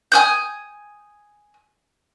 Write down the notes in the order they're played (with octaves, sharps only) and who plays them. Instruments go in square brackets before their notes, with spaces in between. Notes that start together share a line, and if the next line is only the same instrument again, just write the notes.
[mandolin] G#5 D#6 G6